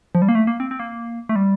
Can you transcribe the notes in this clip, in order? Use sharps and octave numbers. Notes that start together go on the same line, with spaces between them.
F3
G3
A#3
A3
A#3
C4
C4
A#3
A3
G3